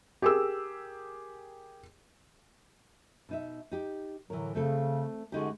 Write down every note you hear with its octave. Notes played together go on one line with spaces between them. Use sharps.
G4 G#4 A#4 E6
B2 D#4 E5
D#4 G4
A2 D3 E3 F#3 A#4
C#3 A3 C4 A4
F#2 D3 G#3 D#4 F#4 G4